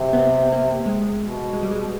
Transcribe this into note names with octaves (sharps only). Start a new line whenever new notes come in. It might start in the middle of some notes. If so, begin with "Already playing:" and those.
Already playing: C3 F#3 C4
B3
C4
A#3
G#3
B2
G#3
G3
G#3
B2